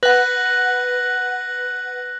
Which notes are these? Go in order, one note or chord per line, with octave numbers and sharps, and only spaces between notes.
B4 F#5 F#6 A#6 F#7